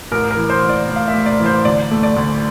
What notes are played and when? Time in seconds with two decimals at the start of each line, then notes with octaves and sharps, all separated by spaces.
0.12 A1 A#4
0.31 A#4
0.37 E3
0.50 C5
0.62 A1
0.69 D5
0.88 A2
0.96 F5
1.08 E5
1.14 A1
1.26 D5
1.39 E3
1.46 C5
1.65 D2 D5
1.91 A3
2.03 D5
2.17 D2